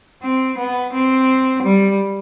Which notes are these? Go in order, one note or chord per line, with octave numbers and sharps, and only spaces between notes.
C4
B3
C4
G3